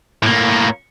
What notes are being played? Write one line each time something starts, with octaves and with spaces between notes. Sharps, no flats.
A2 A#3